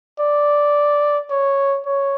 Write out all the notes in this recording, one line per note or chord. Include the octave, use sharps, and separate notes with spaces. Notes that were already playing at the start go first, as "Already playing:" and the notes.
D5
C#5
C#5